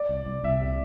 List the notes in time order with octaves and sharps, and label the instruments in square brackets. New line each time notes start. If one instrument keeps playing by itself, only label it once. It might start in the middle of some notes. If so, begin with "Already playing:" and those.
Already playing: [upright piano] D5
[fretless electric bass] C2
C2
[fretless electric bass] C2 [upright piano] E5
[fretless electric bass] C3